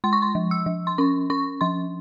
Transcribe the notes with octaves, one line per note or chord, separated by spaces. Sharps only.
G#3 C6
C#6
C6
F3
E6
F3
C6
C#4 C#6
C#4 C#6
F3 C6